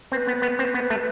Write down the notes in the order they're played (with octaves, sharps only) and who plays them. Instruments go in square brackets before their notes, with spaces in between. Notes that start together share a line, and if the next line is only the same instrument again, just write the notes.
[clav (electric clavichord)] C4 [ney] B4
[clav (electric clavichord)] B3
B3
C4
B3
A3